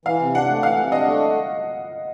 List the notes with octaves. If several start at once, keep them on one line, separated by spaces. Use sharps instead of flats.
E3 F5
C3
D4 F#5
A3
E3 F5
C3
D4 D#5
A3